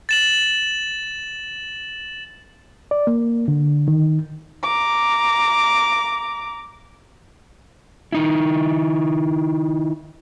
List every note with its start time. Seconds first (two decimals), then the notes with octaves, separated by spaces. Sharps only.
0.09 A6 E7 F#7
2.91 D5
3.07 A#3
3.48 D3
3.88 D#3
4.63 A#5 D6
8.12 D#3 D#4 E4